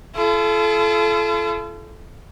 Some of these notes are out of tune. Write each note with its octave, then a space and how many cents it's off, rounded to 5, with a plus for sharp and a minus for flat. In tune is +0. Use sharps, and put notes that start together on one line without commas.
F4 -45 A4 -30